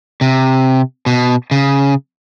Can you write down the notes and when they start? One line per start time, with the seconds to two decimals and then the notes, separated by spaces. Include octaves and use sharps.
0.21 C3
1.06 B2
1.51 C#3